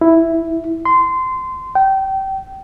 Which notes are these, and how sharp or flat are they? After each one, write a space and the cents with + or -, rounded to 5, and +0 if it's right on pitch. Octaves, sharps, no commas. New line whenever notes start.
E4 +0
C6 -20
G5 -25